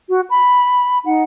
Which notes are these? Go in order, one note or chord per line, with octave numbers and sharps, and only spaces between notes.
F#4
B5
D#4 F#5